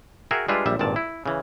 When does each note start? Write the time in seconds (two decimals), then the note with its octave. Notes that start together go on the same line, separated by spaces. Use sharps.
0.31 F#4 G#4 A#4 E5 G5
0.48 G3 G#3 D4 F4 B4 E5
0.66 A#1 G3 E5
0.79 G#1 G2 A#2 D5 A5
0.96 E4
1.26 C#3 E3